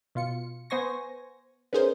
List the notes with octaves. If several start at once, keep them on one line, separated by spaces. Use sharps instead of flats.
B2 F4 C#7
B3 C5 G#5 C#6 A#6
B3 C#4 D#4 G#4 A#4 C5